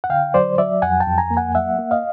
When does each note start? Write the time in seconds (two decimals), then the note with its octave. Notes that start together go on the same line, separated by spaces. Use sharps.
0.04 F#5
0.10 D3 F5 G5
0.34 F#3 C5 D5
0.58 F#3 D5 E5
0.82 F2 F#5 G#5
1.00 G5 A5
1.06 F2
1.18 G#5 A#5
1.31 A#3
1.37 F#5 G#5
1.55 F#3 E5 F#5
1.79 A#3
1.91 D#5 F5